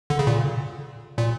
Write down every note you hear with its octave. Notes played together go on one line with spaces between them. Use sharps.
D3
C#3
A#2
A#2